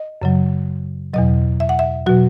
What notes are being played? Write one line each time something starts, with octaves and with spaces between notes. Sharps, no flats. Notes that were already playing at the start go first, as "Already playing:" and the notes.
Already playing: D#5
F#2 C#3 F#3
E2 B2 F#3 D#5
E5
F#5
E5
B2 F#3 F#4